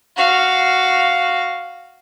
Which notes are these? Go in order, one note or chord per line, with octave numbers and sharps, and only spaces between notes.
F#4 F5